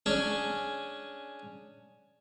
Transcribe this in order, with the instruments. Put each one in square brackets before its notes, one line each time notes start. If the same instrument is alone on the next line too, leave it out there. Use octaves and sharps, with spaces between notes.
[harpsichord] C#4 D4 G#4